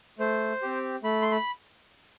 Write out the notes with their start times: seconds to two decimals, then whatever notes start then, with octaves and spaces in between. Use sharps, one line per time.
0.19 A3 C5
0.62 C4 G4
1.03 A3 B5
1.22 C6
1.32 B5